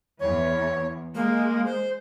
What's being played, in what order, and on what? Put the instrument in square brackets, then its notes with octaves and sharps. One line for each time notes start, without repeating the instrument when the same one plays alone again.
[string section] E2 [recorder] C#5
[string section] G#3 [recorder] A#3
[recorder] C5